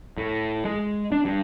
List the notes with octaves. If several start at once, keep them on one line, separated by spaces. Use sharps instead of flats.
A2
G#3
D4
G2